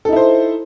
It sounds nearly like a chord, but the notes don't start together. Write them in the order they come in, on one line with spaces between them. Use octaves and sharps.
A4 D#4 E4 C5